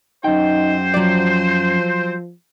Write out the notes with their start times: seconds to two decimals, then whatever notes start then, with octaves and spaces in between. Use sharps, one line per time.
0.24 F#2 C4 D#4 C5 G5
0.94 F3 F#3 D5